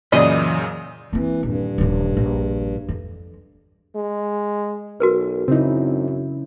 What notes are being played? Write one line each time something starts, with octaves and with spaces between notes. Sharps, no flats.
F#2 A#2 C#3 E3 G#4 D#5 B5
E3 A#3 C4
D#1 G2
D#1 F3
A#1
F2
G#3
B1 F#4 A#4 B4
F#2 C#3 C4 D#4 E4